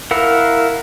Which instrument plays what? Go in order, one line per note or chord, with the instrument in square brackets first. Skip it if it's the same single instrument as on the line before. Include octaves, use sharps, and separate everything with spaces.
[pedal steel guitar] E4 A#4 F5 F#5 E6